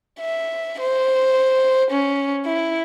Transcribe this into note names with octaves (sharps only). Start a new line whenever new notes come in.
E5
C5
C#4
E4